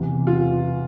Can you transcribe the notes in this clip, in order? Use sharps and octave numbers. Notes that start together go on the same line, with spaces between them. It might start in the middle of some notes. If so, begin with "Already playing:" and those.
Already playing: E2 C3 E3
F4